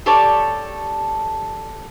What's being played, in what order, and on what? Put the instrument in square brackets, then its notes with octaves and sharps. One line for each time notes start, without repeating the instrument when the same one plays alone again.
[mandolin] G4 A4 C#5 D5